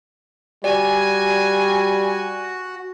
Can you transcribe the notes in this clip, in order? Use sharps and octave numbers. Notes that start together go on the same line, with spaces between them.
G3 F#4 D5 G#5